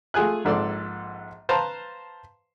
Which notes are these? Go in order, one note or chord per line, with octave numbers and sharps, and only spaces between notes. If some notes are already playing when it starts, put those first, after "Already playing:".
A3 F4 G#4 G#5 F#6
A#1 G#2 A4 D5 C6
B4 C5 F5 A5 A#5 C6